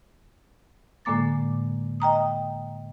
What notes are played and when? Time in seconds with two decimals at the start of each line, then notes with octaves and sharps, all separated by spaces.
1.05 A2 D3 G#3 A#3 D6 A6
2.00 D#5 G5 A#5 D#6